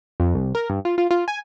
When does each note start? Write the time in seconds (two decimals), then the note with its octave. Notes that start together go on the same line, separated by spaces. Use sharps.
0.20 F2
0.35 C2
0.55 A#4
0.70 G2
0.85 F4
0.98 F4
1.11 F4
1.28 G#5